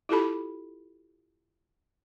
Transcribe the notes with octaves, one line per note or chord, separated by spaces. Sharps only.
E4 F4 G4 A4 A5 B5